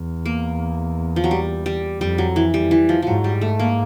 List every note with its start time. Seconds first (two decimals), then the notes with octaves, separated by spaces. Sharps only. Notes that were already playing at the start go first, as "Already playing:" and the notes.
Already playing: E2
0.26 A#3
1.16 F3
1.24 F#3
1.31 G3
1.66 G3
2.01 F2 G3
2.18 F#3
2.36 E3
2.54 G3
2.71 E3
2.89 F3
3.02 G#2 F3 F#3
3.24 G3
3.41 A3
3.59 A#3